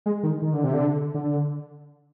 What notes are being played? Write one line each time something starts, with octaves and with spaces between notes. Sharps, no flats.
G#3
D#3
D#3
D3
C3
D3
D3